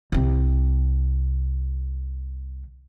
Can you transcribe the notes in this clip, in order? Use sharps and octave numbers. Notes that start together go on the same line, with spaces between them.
C2 C3